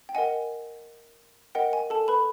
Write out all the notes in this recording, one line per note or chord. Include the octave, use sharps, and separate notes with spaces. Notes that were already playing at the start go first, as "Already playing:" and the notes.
G5
A#4 D#5 F#5 G#5
A#4 D#5 F#5 G5
G#5
A4 A5
B4 B5